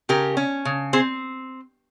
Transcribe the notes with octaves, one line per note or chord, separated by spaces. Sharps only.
C#3 G4 A#4
C#4
C#3
C4 G#4 C5